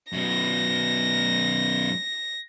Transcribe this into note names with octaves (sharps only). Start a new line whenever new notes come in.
F#2 B2 A#6